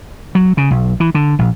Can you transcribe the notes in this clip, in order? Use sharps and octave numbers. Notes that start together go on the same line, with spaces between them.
F#3
C#3
B1
E3
D3
A#1